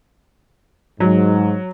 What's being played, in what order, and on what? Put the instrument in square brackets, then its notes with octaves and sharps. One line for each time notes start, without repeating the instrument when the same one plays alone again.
[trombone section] G#2 [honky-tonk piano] F#3